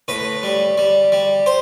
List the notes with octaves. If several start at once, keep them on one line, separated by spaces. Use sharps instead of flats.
A2 B4
G3
G3
G3
C5